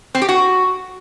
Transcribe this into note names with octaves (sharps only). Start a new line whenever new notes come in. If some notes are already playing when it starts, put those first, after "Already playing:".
C4
G4
F#4